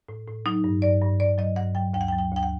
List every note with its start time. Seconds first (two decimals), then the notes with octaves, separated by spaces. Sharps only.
0.09 A2
0.28 A2
0.46 F#3 D#4
0.64 G2
0.82 G2 D5
1.02 G2
1.20 G2 D5
1.38 F#3 D#5
1.56 G2 F#5
1.75 F#3 G5
1.94 D2 G5
2.01 F#5
2.08 G5
2.13 F#3
2.18 G5
2.31 D2
2.36 G5
2.43 F#5